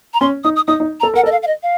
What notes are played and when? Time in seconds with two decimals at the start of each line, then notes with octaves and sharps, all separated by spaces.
0.14 A#5
0.21 C#4 C6
0.44 D#4 D#6
0.56 D#6
0.68 D#4 D#6
0.80 D#4
1.00 A#5
1.03 A4
1.14 A#4 F#5
1.23 A4 D#5
1.32 F5
1.43 F5
1.47 D#5
1.63 F5